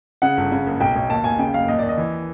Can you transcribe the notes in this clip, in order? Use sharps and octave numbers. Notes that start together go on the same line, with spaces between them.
C#3 F#5
G1
C#3
F#1
B1 G5
B1
D#2 A5
D#2 G#5
C#3 G5
F#1 F5
D#2 D#5
D#2 D5
D#5
E3